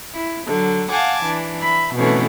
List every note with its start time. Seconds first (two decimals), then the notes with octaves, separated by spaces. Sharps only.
0.13 E4
0.45 D3 F#3
0.89 F5 F#5 G#5 A5 D6
1.25 E3 D4
1.59 E5 B5
1.96 B2 D3 E3 A3 C4 C#4